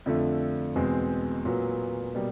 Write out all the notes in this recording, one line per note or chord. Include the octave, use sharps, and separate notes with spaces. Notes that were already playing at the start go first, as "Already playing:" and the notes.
F2 D3 F3 A3
E2 B2 G#3 C4
A#2 F#3 B3
B2 G3 A#3